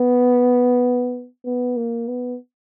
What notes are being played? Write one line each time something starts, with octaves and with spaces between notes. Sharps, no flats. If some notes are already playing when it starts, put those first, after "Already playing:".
Already playing: B3
B3
A#3
B3